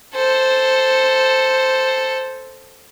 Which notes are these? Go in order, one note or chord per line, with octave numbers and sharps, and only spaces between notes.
A4 C5